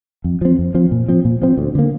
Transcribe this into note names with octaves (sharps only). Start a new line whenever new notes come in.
F2
F3 C4
F2
F3 C4
A#2
F3 C4
A#2
F3 C4
D2
D3 A#3